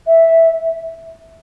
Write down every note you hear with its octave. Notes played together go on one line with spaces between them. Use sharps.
E5